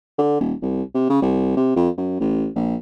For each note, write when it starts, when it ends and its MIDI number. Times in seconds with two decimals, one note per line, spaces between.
0.18 0.39 50
0.40 0.54 27
0.62 0.82 36
0.94 1.07 48
1.10 1.19 49
1.22 1.52 36
1.56 1.72 48
1.76 1.89 41
1.98 2.19 42
2.20 2.48 33
2.55 2.76 34